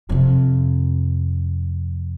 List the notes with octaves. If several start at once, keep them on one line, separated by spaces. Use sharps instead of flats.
F2 C3